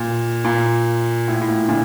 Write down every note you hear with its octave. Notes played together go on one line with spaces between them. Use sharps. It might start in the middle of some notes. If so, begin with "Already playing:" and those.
Already playing: A#2
A#2
A2
A2
A#2
A#2 D3